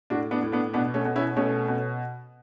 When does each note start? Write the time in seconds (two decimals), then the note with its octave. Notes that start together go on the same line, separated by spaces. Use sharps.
0.10 A2 D4 F#4
0.31 B3 D4
0.42 A2
0.52 B3 D4
0.73 B2 B3 D4
0.94 A3 C#4
1.05 B2
1.16 C#4 E4
1.36 B2 A3 C#4
1.68 B2